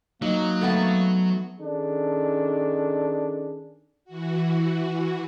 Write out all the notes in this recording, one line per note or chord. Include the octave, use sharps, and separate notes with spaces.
F#3 A#3 D#4
A3 B3 A5
D#3 C#4 D4 G#4 A4
E3 F#4